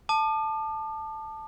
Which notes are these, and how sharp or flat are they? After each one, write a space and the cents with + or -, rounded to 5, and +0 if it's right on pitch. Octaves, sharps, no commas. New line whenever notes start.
A5 +0 D6 +45